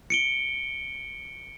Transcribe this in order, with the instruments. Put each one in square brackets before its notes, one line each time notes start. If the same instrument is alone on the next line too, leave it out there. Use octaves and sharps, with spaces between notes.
[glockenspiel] C#7 D7 G7